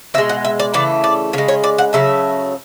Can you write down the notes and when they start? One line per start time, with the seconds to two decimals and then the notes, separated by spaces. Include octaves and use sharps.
0.14 B2 E5
0.18 G#3
0.29 F#5
0.45 E5
0.60 D5
0.74 C#3 E3 A3 D5
1.04 D5
1.33 C#3 C#5
1.38 G#3
1.48 C#5
1.64 D5
1.78 F#5
1.93 C#3 F#3 A3 E5